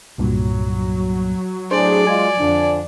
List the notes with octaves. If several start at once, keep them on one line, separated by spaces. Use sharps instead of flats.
C2 G2 A#2 F#3
A2 D4 G#4 C5 D5
G#3 F4 G#5
F2 D3 F3 D4